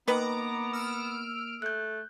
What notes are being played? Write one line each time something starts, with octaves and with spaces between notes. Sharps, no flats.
D#3 A#3 B3 B4 F#5 A#5 D6
E6 F6 D7
A3 F#6 G6